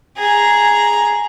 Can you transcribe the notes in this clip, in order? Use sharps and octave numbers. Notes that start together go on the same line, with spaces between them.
G#4 A#5